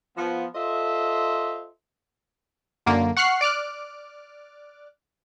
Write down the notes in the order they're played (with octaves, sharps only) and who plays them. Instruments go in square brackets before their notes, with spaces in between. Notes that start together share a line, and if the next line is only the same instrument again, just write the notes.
[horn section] F3 B3
F4 A4 C5 D#5 E5 C6
[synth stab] F#2 D3 A#3
F#5 C#6 F6 F#6 C7
D5 D6 F6 F#6